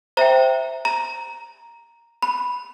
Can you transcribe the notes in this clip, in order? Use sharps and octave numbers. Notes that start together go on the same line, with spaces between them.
C5 E5 G5 A#5
A#5
B5